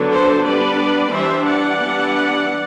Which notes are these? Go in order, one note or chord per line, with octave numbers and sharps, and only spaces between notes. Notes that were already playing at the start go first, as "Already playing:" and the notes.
Already playing: D3 F#3 B3 D4
A4 C5
G3 B3 D4 B4 D5
E3 G3 D4 C5 E5
D5 F#5
E3 G3 B3 D4